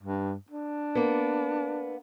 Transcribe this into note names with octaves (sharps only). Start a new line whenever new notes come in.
G2
D4
A#3 B3